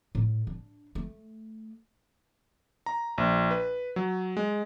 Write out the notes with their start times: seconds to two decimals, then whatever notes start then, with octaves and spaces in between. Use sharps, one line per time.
0.15 A2
0.47 D4
0.95 A3
2.86 A#5
3.18 A#1
3.51 B4
3.96 F#3
4.37 G#3